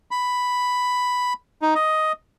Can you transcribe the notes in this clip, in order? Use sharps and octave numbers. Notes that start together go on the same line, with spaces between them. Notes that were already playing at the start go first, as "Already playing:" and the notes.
B5
D#4
D#5